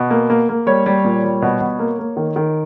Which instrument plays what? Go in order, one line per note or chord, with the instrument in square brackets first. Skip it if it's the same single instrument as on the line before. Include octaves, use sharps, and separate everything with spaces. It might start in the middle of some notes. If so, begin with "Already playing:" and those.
Already playing: [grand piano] B2
A#3
A#3
A#3
G3 C#5
G3
A#2
G3
B2
B2
A#3
A#3
D#3
D#3